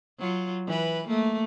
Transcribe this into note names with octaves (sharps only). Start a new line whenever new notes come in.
F#3 F4
E3 B4
A3 A#3